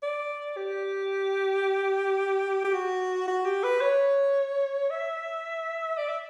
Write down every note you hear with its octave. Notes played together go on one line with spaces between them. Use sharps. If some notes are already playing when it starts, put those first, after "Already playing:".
D5
G4
G4
F#4
F#4
G4
B4
C#5
E5
D5
E5